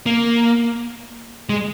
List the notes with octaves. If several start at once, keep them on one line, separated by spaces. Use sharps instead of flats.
A#3
G#3